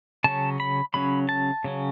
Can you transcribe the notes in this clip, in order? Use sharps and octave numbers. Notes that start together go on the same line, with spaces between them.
C#3 F#3 C#4 A5
B5
C#3 F#3 C#4 B5
A5
C#3 F#3 C#4